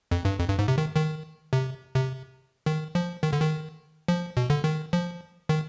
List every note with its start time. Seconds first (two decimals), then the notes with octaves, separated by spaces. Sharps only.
0.11 F2
0.25 G2
0.39 F2
0.49 G2
0.59 G#2
0.68 C3
0.78 D#3
0.96 D#3
1.53 C3
1.95 C3
2.66 D#3
2.95 F3
3.23 D#3
3.33 D3
3.42 D#3
4.08 F3
4.37 B2
4.50 D3
4.64 D#3
4.93 F3
5.49 D#3